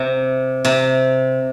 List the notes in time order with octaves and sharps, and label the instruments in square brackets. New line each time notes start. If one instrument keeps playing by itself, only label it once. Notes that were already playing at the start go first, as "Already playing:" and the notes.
Already playing: [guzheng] C3
C3